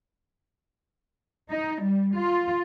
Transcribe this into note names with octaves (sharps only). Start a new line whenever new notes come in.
D#4
G3
F4